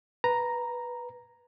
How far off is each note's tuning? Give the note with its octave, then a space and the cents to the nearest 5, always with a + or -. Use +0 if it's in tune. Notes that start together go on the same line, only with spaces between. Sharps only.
B4 -10 A#5 +0